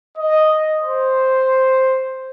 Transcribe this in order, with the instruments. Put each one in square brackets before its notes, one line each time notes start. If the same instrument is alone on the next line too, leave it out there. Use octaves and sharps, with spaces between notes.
[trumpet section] D#5
C5